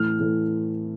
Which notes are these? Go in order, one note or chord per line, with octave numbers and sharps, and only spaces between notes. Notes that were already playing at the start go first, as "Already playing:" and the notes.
Already playing: A2 E3 A3 F6
A2 E3 A3